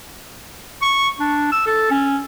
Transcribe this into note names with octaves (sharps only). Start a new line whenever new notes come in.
C#6
D4
E6
A4
C#4